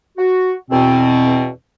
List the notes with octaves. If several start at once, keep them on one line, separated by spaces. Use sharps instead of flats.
F#4
E2 B2 C4